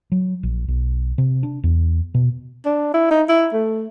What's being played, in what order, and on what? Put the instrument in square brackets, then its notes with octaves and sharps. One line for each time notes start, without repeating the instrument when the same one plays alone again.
[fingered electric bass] F#3
A#1
B1
C3
D4
E2
B2
[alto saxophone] D4
E4
D#4
E4
A3